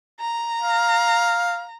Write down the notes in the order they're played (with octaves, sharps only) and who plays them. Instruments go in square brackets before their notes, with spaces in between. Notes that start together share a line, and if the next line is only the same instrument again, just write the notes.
[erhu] A#5
[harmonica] F5